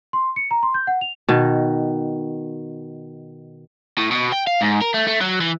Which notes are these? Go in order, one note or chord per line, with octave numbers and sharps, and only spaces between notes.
C6
C#7
A#5
C6
G6
F#5
F7
B2 D#3
A2
B2
G5
F5
G#2
A#4
A3
A3
F#3
E3